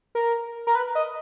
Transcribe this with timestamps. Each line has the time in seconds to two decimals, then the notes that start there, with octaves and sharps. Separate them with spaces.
0.15 A#4
0.67 A#4
0.75 B4
0.95 D#5